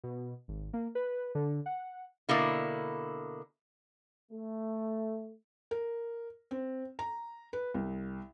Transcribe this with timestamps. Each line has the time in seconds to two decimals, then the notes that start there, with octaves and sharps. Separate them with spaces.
0.04 B2
0.48 G#1
0.73 A#3
0.95 B4
1.35 D3
1.66 F#5
2.29 B2 D3 A#3 E4
4.31 A3
5.71 A#4
6.51 C4
6.99 A#5
7.53 B4
7.74 C2